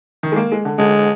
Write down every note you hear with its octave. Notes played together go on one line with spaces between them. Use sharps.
D#3
G#3
A#3
G#3
D3
D3 G#3